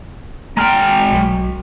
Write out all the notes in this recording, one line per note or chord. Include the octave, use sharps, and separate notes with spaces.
G#3 G5 A#5 C6 F6
B1 F#3